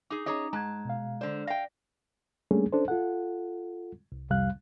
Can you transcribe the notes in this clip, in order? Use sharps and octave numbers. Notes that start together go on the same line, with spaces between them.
D#4 G#4 D6
C#4 D#4 G#4 C#5 D#5 A#5 D6 D#6
G#2 G#3 A5 A#5 F#6 G#6
B2 F5
D3 C5 D5
F5 G5 A#6
G3 A3 A#3 C#4 D4 G#4
C#4 D4 A4 C5
F4 A4 F#5
C2
C2 F2 C3 G3 F5 F#6